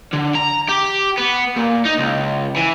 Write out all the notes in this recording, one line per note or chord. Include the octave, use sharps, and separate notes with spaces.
D3
A#5
G4
B3
A#2
D#4
C#2
E3